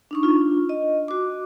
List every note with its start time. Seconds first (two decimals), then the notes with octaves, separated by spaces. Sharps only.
0.11 D4 D#4 C#6
0.23 D4 F4
0.69 D#5
1.08 F#4 D6